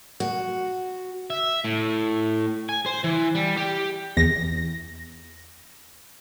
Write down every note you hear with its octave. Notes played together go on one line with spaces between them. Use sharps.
F#4
E5
A2
G#5
C5
E3
G3
G4
E2 A#6